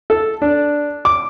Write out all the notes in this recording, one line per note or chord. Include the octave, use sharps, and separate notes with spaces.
A4
D4
D6